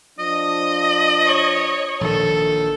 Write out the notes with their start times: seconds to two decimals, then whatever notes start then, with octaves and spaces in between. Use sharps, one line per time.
0.19 F3 D4 D#5
1.26 C#5
2.01 A#1 D#3 A4